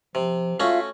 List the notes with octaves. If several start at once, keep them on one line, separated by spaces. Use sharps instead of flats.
C3 F3
A3 C#4 F4 F#4 E5 F5